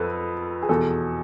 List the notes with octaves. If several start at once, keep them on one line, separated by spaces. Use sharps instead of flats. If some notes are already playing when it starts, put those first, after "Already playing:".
Already playing: F2 A4 B4
G#4
E2 B2 A4